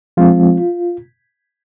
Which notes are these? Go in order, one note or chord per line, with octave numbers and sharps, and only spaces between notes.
F3 G#3 C4 F4